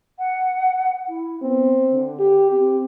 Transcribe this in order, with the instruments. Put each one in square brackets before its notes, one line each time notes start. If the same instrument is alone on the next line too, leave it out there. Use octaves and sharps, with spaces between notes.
[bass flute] F#5
E4
[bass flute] B3 [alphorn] C4
[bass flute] D3
[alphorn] G4
[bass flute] C4 [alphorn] G4